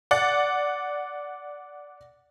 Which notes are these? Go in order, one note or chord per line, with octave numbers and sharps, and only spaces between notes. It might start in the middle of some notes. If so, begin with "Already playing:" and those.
D5 F#5